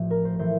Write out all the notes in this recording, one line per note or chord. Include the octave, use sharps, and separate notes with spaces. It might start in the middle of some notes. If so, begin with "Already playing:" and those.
Already playing: A1 A2 F3
A#4
C5
A2 E3 C5